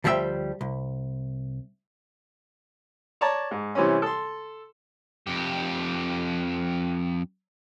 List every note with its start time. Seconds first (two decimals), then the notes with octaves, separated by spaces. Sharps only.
0.04 D2 F3 G3 D#4 E5 G5
0.61 C2
3.21 C#5 D5 A5 A#5
3.51 G#2
3.75 C3 E3 G3 C4 C#4
4.02 A4 C6
5.27 F2 G4